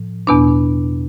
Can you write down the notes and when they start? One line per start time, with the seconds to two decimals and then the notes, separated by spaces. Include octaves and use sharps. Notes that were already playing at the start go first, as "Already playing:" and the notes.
Already playing: A2 F3
0.27 E2 B2 B3 D4